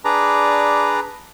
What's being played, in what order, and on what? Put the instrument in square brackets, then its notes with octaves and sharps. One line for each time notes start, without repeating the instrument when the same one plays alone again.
[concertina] D4 G#4 B4 D5 A#5